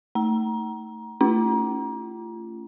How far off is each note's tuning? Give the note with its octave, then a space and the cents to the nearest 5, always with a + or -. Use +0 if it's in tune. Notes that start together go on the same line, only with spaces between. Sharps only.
A3 +25 A#5 +20
A3 +25 C#4 +0 F4 -30